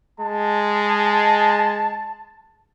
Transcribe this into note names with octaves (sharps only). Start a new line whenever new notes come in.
G#3 A5